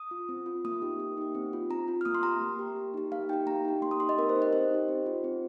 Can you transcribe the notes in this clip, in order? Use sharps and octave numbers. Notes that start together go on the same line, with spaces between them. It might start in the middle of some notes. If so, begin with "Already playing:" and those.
Already playing: D#6
F4
C4
F4
A#3 D#6
D#4 G4
A#3
D#4 G4
C4
F4
C4 A#5
F4
F6
A#3 D#6
C6
G4 A#5
A#3
G4
A#3
D#4 G4
A#3 F5
D#4 G4 G5
A#3 A#5
D#4 G4
A#3 C6
D#6
D#4 G4 C6
D#5
C4 A#4
C5
D#4 G4
D#5
C4 C5
D#4 G4
C4
F4
C4